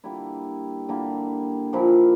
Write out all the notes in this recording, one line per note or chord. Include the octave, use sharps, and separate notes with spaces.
D3 G3 A#3 E4
D3 G3 A#3 E4
A#2 F3 A#3 E4